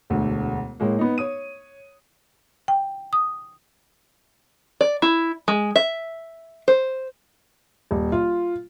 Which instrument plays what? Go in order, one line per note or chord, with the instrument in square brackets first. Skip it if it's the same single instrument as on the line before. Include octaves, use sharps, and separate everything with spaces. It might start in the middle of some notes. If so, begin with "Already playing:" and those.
[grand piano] E1 D2 A3
A2 G#3 A#3
B3 D#4
C#5 D#6 D#7
[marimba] G5
D#6
[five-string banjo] D5
E4
G#3
E5
C5
[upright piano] D#1
F4